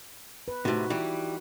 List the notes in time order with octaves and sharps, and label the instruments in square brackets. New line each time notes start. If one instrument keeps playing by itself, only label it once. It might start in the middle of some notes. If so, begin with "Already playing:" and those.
[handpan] B4
[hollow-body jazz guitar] A2 C3 [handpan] D#4 F#4
[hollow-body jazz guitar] E3 G3